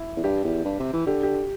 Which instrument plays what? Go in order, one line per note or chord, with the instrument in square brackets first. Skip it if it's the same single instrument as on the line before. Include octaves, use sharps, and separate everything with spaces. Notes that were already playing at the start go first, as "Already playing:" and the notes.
Already playing: [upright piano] E4
[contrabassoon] E2
[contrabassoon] G2 [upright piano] G4
[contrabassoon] E2
G2
C3
E3
[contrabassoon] D3 [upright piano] G4
[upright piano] G4